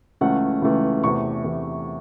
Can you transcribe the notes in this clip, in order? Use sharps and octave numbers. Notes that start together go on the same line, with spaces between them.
C#2 C#3 E3 A3 C#4 F#5
C#2 C#3 E3 A3 C#4
E2 C3 E3 A3 C#6
E2 C3 E3 A3